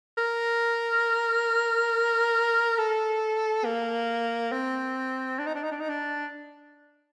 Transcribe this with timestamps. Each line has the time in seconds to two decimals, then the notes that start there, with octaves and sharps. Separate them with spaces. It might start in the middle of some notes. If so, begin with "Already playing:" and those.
0.18 A#4
2.78 A4
3.65 A#3
4.52 C4
5.39 D4
5.47 D#4
5.55 D4
5.64 D#4
5.72 D4
5.80 D#4
5.89 D4